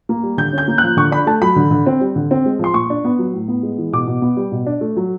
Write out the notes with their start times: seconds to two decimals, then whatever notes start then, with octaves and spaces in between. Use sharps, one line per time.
0.09 A#3
0.23 G3
0.38 D3 G6
0.53 C#4
0.58 G6
0.68 A#3
0.78 F#6
0.83 F3
0.97 D3 C#6
1.11 D4 B5
1.27 A3 A5
1.42 F#3 B5
1.56 D3
1.71 D3
1.86 C4
2.01 G3
2.16 D3
2.31 C4
2.46 G#3
2.59 F3 C6
2.74 A#2 C#6
2.90 D4
3.05 B3
3.19 F#3
3.34 A2
3.48 B3
3.63 G#3
3.78 E3
3.92 B2 D6
4.07 B2
4.22 B3
4.37 G3
4.52 B2
4.66 D4
4.81 A3
4.97 F#3